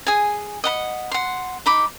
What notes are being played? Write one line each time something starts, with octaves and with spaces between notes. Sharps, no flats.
G#4 G#5
D#5 F#5 B5
F#5 C6
D#4 B5 D6